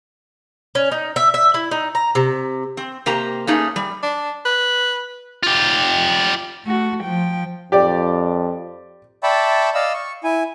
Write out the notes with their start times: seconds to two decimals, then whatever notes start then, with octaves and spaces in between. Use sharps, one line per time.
0.75 C#4
0.91 D#4
1.16 E5
1.34 E5
1.54 E4
1.71 D#4
1.95 A#5
2.15 C3
2.77 C4
3.06 C3 A#3 G4 A#5
3.47 A3 A#3 C#4 D#4 G#4
3.76 G3
4.03 D4
4.46 B4
5.43 F4 G4
6.65 A3 F#4
7.04 F3 G5
7.72 F2 G4 D5
9.23 D5 E5 G5 A5 B5 C#6
9.75 D5 D#5 F5 E6
9.94 C#6
10.24 E4 G#5